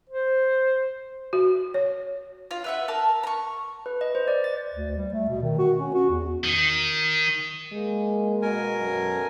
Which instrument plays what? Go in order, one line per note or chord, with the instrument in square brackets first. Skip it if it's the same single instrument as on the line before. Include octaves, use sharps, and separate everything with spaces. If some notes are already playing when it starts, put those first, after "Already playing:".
[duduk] C5
[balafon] F#4
C#5
[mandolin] F4
B4 E5 F#5
A#4 A5
A#5 C#6
[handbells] B4
D#5
C5
D5
A6
[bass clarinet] D2
G3
A3
B2
D#3
F#4
C#4
F#4
E2
[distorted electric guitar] D#3
[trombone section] G#3 A#3
[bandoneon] B2 A#4 G#5
[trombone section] F#2 A4